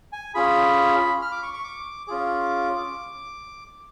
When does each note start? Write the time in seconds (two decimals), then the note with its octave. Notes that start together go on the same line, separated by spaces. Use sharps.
0.13 G#5
0.35 C#4 F4 G#4 B5
1.22 F6
1.32 D6
1.43 C#6
1.54 C#6
1.64 D6
2.07 C#4 F4 G#4 D6